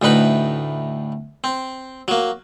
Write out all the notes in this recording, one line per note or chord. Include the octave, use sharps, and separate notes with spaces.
D2 A2 D#4 B4 B5
C4
F#3 A#3